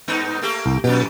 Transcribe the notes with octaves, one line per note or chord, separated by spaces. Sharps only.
G2 B3 D#4
A3 A#3 G4
C2
F2 B2 G4